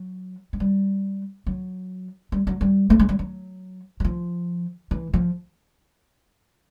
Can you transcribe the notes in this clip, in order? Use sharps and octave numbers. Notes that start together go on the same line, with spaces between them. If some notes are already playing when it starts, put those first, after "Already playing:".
Already playing: F#3
G#3
G3
F#3
G3
F#3
G3
A3
G#3
G3
F#3
F#3
F3
E3
F3